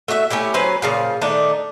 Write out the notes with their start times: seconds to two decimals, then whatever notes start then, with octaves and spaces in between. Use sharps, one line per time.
0.08 A3 F#4 D#5 E5
0.30 A3 C#4 E4 G4
0.54 F#3 C#4 B4 C5
0.82 A#2 C#3 F3
1.21 D#3 A3 D4 D#4